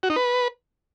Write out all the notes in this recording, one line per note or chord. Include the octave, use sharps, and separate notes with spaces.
F#4
D#4
B4